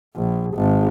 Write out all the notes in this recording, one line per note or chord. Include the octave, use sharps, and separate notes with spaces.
A#1
G#1